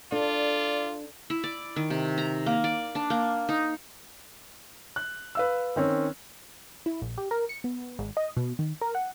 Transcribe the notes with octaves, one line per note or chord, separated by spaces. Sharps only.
D4 F4 A4 D5
E4
D5
D#3
C3
A#5
A#3
D5
D4
A#3
D#4
F#6
B4 F5 E6
D#3 C4 C#4
E4
A#1
G4
A#4
C#7
B3
G#1
D#5
B2
D#3
A#4
F#5